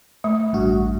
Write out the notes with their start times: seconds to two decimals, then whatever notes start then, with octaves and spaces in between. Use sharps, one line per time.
0.24 A3
0.53 A1 G2 F#4